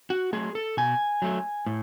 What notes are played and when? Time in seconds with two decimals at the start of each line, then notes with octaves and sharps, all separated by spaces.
0.10 F#4
0.33 F#3 A3 G#4
0.55 A4
0.77 B2 G#5
1.22 F#3 A3
1.66 A2